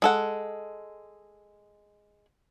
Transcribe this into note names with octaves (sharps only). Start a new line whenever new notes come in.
G#3 A4 F#5